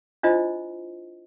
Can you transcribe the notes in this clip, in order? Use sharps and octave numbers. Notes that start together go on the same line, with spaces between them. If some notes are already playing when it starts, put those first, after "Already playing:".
D4 E4 F4 C5 D#5